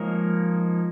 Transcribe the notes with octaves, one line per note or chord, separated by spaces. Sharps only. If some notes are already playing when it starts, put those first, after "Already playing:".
Already playing: F3 G#3 A#3 D#4 A#4 C#5